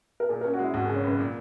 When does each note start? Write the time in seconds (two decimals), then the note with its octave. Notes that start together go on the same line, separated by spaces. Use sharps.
0.20 A#4
0.29 A#2 G#4
0.41 A#4
0.44 C#4
0.54 F#4
0.59 G#3 E4
0.74 G#1 F#4
0.86 G#4
0.89 C#3
0.96 C#5
1.04 F#2 B4
1.19 A#2